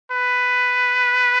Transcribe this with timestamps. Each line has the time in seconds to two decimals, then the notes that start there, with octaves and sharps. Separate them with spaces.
0.12 B4